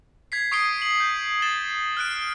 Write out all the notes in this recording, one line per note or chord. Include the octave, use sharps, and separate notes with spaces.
G#6 B6 C7
C#6 D#6 C7 D7 G7
F#7
G6
A6 E7 G7
F6 F#6 D7